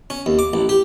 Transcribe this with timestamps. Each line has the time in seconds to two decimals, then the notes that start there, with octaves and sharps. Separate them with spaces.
0.10 C#4
0.26 D#2
0.39 D6
0.53 A1
0.69 G4